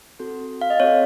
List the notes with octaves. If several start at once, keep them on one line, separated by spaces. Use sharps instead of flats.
C4 F#4 A4
F5
D#5
C4 F#4 A4 C#5